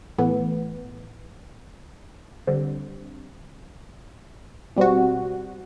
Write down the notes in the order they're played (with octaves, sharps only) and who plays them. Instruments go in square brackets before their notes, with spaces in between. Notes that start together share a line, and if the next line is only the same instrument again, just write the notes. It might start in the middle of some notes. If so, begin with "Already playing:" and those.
[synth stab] A2 E3 B3
D3 G3 C4
B2 G3 C4 F#4